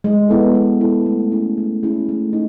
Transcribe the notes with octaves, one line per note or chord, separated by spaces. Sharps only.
G#3
B3 E4 A4
G#3
B3 E4 A4
A3
C#4 E4 G#4
A3
C#4 E4 G#4
A3
D#4